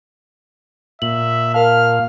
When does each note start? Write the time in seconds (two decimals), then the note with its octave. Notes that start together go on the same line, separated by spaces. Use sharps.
1.02 A#2 E5 F#7
1.54 A#4 F5 A5 F6